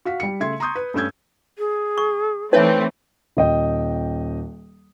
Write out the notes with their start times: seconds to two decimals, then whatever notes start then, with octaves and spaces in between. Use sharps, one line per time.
0.05 F#4 F5 B6
0.20 G3 C#7
0.40 C#3 A3 E5 C6 G#6
0.60 A#5 C6 C#6 D#6 G6
0.75 B4
0.94 G2 A3 C#4 E6 G6 G#6
1.58 G#4
1.98 C#6
2.53 E3 A3 C4 D#4 B4 C#5 E5 G5
3.37 D#1 D#5 G5